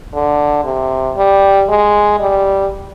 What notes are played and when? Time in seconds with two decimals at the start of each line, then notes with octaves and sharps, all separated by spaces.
0.14 D3
0.65 C3
1.17 G3
1.69 G#3
2.20 G3